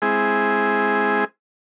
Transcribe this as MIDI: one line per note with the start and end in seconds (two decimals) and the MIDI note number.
0.02 1.25 56
0.02 1.25 60
0.02 1.25 64
0.02 1.25 68